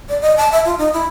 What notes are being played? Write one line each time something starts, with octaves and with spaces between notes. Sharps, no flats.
D5
D#5
A5
E5
F4
D#4
E4